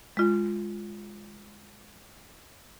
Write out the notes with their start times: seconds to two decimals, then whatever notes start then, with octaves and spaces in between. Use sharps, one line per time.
0.17 G#3 F4